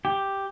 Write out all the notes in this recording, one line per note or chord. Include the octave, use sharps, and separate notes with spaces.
G4